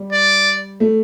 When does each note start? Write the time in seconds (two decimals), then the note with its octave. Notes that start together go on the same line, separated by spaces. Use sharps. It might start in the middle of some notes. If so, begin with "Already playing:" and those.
Already playing: G3
0.13 D5
0.80 A3